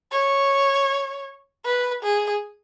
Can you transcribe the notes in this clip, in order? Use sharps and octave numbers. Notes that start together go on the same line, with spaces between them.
C#5
B4
G#4